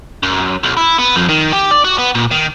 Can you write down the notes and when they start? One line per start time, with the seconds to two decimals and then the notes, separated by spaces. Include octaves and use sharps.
0.23 F#2
0.63 B1
0.77 E4
0.98 B3
1.16 F2
1.29 D#3
1.53 G4
1.71 D5
1.85 F#4
1.98 B3
2.15 A#2
2.31 D#3